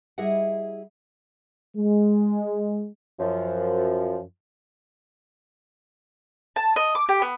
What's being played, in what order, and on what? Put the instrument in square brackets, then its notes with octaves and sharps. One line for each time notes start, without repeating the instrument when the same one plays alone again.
[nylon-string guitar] G3 E4 G#4 D#5 E5 F#5
[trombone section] G#3
[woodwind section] F#2 F3
[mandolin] A5
D#5
D6
G4
B3